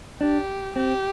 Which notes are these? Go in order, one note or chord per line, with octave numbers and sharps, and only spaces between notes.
D4 G4
C4 G4